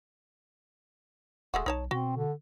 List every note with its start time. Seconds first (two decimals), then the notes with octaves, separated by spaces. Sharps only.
1.54 D#1 G#3 A3 F#4
1.66 B1 D#4 C#5 A5
1.91 B2 C4 F#4
2.16 D3